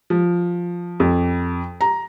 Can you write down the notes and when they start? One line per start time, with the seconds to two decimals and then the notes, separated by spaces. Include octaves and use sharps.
0.10 F3
1.00 F2
1.81 A#5